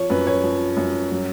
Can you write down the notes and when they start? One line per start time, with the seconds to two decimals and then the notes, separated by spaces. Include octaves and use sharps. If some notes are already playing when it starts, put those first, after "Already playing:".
Already playing: F3 C#5
0.10 F#2 B4
0.27 C#5
0.44 F3
0.77 F#2
1.11 F#3